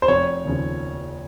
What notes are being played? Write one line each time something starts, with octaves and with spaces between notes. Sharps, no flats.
C5
F1 C#5
D#2 C#3 F3